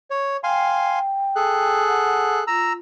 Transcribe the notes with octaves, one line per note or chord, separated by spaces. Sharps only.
C#5
F5 G5 G#5 C6
G#4 A4 F#6
F#5
F4 A#5 E6